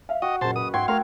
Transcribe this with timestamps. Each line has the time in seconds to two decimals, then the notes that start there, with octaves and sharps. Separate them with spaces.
0.09 E5 F5
0.22 F#4 D#5 G5
0.41 F#1 A#2 G#4 C5 A5
0.56 B4 D#6
0.74 G#2 F#4 E5 G5 C6 G#6
0.88 A3 A#4 F5 C6 C#6